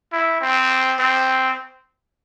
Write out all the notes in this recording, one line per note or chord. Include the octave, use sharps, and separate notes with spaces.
E4
C4
C4